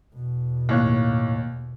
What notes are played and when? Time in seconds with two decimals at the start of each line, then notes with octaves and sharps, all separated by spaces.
0.14 E2 B2
0.69 D#2 A2 C#5 F5 F#6